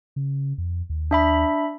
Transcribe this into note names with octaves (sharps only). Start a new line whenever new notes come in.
C#3
F2
D#2
D4 E5 B5